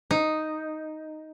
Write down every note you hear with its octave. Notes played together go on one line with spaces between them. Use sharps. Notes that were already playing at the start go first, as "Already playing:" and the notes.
D#4